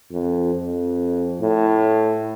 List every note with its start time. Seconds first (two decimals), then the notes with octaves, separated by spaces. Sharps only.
0.12 F2
0.56 F2
1.41 A2